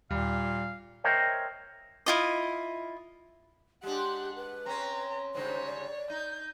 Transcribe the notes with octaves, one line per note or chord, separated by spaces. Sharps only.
D#2 A#2 G3 F5
A#4 C5 C#5 D#5 E5 G5
E4 F4 D#5
G#3 D4 G4 F#5
B4
C4 C#4 A#5
G#2 C#3 G3 C5 C#5
D5
D#4 G6